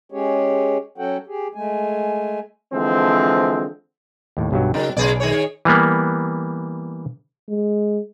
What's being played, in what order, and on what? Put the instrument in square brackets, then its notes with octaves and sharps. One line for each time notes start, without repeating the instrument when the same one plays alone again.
[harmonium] G#3 C#4 G4 G#4 C#5
F#3 C#4 F#4 A4 F#5 G5
G4 G#4
G#3 A3 G#5
[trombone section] D3 E3 F3 G#3 C4
[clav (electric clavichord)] D#2 A2
B1 G2 F#3
[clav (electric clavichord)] C#3 D#4 A#4 [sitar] F#3
[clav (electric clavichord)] B1 B4 A#5 [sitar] C#3 G#4 D5
[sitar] D#3 G#4 C#5
[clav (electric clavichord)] E3 G3 A#3 B3
[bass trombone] G#3